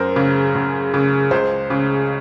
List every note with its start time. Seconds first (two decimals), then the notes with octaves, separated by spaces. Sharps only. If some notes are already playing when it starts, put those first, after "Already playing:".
Already playing: F#2 A#4 C5
0.16 C#3
0.55 F#2
0.94 C#3
1.31 C#2 C5
1.70 C#3